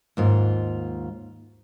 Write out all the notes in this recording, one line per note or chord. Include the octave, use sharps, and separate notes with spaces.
D#2 G#2 F4